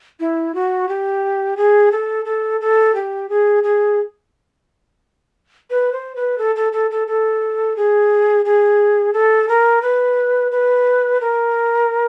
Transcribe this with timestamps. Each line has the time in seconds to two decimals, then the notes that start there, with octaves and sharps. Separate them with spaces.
0.20 E4
0.55 F#4
0.89 G4
1.57 G#4
1.92 A4
2.25 A4
2.61 A4
2.95 G4
3.29 G#4
3.64 G#4
5.70 B4
5.92 C5
6.16 B4
6.38 A4
6.56 A4
6.73 A4
6.91 A4
7.07 A4
7.77 G#4
8.45 G#4
9.13 A4
9.49 A#4
9.82 B4
10.52 B4
11.21 A#4